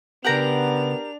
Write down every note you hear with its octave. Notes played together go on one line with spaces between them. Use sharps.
C#3 B3 D4 G4 A#4 F#5 A#5 F7